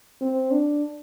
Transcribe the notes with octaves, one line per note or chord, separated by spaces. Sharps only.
C4
D4